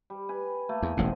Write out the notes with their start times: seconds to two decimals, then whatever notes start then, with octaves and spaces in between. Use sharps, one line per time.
0.10 G3
0.29 B4 G#5
0.69 A3 A#3 G#5
0.82 E2
0.97 E1 A1 A2 D3 D#3 C4